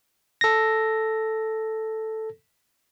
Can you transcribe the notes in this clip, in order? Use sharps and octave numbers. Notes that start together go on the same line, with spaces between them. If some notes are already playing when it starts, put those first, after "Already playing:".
A4 A#6